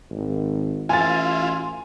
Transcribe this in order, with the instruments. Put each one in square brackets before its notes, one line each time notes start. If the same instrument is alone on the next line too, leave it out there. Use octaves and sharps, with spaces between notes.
[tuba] G#1
[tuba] A1 [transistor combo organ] E4 F4 [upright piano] G#5 A6 [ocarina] C6